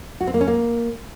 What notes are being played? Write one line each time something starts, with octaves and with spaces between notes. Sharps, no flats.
F#4
C4
A#3
C#4
A#3